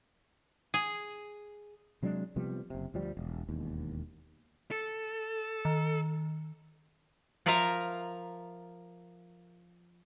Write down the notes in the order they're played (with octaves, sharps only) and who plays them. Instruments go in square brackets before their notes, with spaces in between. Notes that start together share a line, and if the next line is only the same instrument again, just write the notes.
[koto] G#4
[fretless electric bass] C3 F#3 G#3 D4
C3 F3 G3 B3
F#1 C3
D2 F3 G3
E1
E1 D#2
[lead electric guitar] A4
[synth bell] D#3
[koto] F3 F4 A#4 E5 F5 A#5